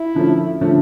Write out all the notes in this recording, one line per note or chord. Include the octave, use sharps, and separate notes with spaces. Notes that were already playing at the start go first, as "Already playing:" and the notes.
Already playing: E4
D3 F3 A3 C#4
D3 F3 A3 C#4